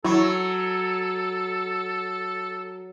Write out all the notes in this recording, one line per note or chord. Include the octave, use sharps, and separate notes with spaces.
F#3 E4 A4 C#6